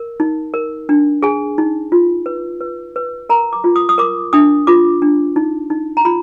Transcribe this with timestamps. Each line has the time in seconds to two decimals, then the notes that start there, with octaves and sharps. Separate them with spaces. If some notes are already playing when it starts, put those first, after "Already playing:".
Already playing: A#4
0.20 D#4
0.54 A#4
0.89 D4
1.23 G#4 G#5
1.58 D#4
1.92 F4
2.26 B4
2.61 B4
2.96 B4
3.29 A#4 A#5
3.53 D6
3.64 F4
3.76 D#6
3.89 D#6
3.98 A#4 D6
4.33 D4 D#6
4.67 F4 D6
5.02 D4
5.36 D#4
5.70 D#4
5.97 A#5
6.05 F4 B5